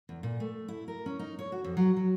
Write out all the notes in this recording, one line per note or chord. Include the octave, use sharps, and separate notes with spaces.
E2
A#2
A3
E4
A#4
C#4
D#4
C#5
F#4
F2
F#3
F#3